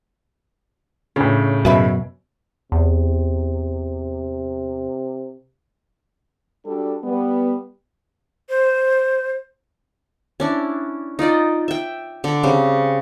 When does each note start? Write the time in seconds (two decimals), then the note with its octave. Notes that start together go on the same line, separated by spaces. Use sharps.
1.16 A2 C#3 D4
1.65 F#2 B2 F#4 E5 B5
2.72 E2 C3
6.65 G3 D4 F#4 A4
7.04 G3 B3
8.49 C5
10.40 C#4 D4 E4
11.19 D#4 F4 D5 D#5
11.68 E5 G5
12.24 D3 B5
12.43 C#3 G3 C4